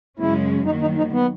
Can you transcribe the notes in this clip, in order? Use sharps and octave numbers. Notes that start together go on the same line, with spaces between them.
F#2 C#3 G#3 C#4 E4
D#3 F#3 A#3 D#4
D#4
D#4
B3